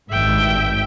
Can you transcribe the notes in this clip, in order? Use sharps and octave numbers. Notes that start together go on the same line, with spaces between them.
G#1 G2 E5 G5